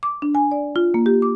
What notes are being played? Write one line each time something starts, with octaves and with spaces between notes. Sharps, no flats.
D6
D4
G#5
D5
F4
A#3
G4
D6